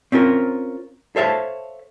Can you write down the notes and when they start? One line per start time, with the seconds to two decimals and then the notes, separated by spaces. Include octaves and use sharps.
0.12 C4 C#4 F4 A#4
1.16 A4 C5 C#5 E5 F5 A5